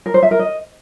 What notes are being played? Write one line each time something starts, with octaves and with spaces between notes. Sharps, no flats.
A#4
C5
E5
A#4
D#5